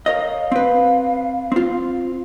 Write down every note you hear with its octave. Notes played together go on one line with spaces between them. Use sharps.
A#4 C#5 D#5 F5
C4 B4
C4 F4